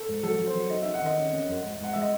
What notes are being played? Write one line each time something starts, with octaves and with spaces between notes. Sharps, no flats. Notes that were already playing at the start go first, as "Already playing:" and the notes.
Already playing: A4
G#2
F#3 A4
F#3
C5
F#3
D#4 D#5
D#4 E5
F#5
D#3 D#5
C#4
C#4
F#2
G#2
G#2 F#5
G#3 E5
D#5